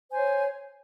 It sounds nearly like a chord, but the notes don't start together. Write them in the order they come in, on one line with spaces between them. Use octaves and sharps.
C5 G#5 C#5